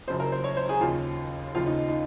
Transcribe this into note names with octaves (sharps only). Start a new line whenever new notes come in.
F#1 F#2 C#3 F3 C5
A#4
C5
C#5
C5
G#4
D#2 C#3 F3 F4
D#2 C#3 F3 F4
D#4
D#4